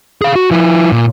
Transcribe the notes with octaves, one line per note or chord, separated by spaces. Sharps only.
G#4 F5
F#4
F3 E4
A#2